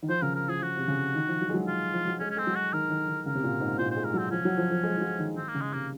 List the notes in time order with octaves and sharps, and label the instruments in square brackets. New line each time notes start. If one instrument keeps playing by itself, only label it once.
[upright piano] D#3
[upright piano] F3 [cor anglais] C5
[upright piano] C#3 [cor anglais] A#4
[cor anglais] A#4
[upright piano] F3 [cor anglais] G#4
[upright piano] F3 [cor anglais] F#4
[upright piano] C3
C#3
D#3
F3
F#3
G#3
F#3
[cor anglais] F4
[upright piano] F3
F#3
[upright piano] G#3 [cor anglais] C#4
[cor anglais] C#4
[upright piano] G#3 [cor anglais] C4
[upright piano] F#3
[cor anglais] F#4
[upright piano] D#3 [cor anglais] A#4
[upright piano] D#3
D#3
[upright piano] C#3 [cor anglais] A#4
[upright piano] C3
A#2
G#2
[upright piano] A#2 [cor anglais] C5
[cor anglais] C5
[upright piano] G#3
[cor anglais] A#4
[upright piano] F#3 [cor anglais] C4
[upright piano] F3 [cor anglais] C#4
[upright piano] F#3
F3
F3
G#3
F3
F#3
D#3
[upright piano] D#3 [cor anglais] C4
[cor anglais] A#3
[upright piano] C#3
[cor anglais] G#3
[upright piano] C3 [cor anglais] A#3